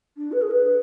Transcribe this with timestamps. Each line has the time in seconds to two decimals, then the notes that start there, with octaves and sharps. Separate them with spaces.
0.17 D4
0.32 B4
0.41 G#4
0.50 B4